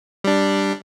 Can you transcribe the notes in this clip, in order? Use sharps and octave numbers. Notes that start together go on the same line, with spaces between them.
G3 D4